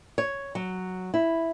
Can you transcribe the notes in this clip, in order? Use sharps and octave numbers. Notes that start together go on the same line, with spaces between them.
C#5
F#3
E4